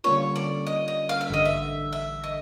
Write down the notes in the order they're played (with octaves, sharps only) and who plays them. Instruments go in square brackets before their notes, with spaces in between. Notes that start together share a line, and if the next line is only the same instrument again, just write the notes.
[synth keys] D3 G3 A#3 C#4 F4 [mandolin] C#5
[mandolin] D5
D#5
D#5
F5
E5
[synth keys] A1 G2 D3 [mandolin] D#5
[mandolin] E5
E5
D#5